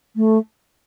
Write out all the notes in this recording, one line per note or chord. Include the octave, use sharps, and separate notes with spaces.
A3